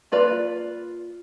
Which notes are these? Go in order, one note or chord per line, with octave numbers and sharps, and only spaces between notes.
A#3 F4 B4 D5